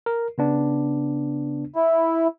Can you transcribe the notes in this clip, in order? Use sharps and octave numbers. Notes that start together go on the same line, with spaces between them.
A#4
C#3 B3 D4
E4